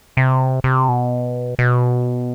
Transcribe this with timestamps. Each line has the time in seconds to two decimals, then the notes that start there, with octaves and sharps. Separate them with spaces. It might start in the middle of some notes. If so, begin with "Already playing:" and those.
0.17 C3
0.64 C3
0.88 B2
1.59 B2